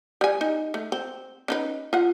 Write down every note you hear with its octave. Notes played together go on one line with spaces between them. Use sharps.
G3 G#5
D#4
A3
C4
C#4 D#4 B4
F4 F#5